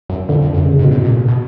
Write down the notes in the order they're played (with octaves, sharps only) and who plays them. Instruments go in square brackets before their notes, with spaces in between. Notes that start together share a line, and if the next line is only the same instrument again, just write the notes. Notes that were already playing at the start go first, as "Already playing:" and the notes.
[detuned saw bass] F#2
[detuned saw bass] F2 [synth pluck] D3
[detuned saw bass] F2
F#2
[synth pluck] C#3
[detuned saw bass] G#2
[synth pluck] B2
[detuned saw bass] A2
A#2
B2